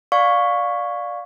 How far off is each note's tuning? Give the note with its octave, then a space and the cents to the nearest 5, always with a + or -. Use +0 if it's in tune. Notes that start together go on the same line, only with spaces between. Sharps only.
D5 +0 F5 +20 C#6 +0